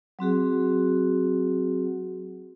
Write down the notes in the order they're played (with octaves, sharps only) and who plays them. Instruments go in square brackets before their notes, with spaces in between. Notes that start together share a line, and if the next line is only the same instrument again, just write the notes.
[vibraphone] F#3 C4 F#4 G#4